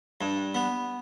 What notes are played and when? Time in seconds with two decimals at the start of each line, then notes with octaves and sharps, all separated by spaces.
0.21 G2
0.55 B3